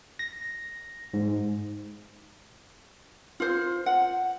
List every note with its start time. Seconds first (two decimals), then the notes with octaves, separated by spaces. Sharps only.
0.19 A#6
1.14 G#2
3.40 F4 C5
3.86 F#5